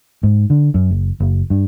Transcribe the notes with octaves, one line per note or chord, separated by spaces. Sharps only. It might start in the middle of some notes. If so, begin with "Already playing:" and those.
G#2
D3
F#2
F#1
F#1
G2